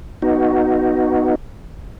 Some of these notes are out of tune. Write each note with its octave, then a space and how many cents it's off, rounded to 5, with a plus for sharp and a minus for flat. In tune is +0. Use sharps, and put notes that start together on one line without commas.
B3 +0 D#4 +0 F#4 +0